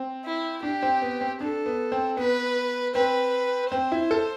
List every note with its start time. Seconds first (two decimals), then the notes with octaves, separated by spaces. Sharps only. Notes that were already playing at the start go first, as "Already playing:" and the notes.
Already playing: C4
0.24 E4
0.62 D4 G4
0.83 C4
1.02 B3
1.21 C4
1.41 D4 A4
1.66 B3
1.92 C4
2.17 B3 B4
2.95 C4 B4
3.72 C4 C5
3.92 E4
4.11 A4